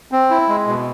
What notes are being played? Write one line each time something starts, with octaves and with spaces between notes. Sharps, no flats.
C4
E4
G#3
B2